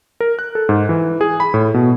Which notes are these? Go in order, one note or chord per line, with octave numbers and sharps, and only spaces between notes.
A#4
F#6
A4
G#2
E3
G#4
B5
A2
B2